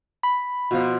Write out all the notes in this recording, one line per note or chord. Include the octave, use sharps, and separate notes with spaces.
B5
B2 F3 F4